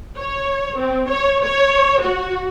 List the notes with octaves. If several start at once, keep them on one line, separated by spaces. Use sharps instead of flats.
C#5
C4
C#5
C#5
F#4